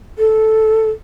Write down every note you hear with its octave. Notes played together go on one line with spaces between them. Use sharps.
A4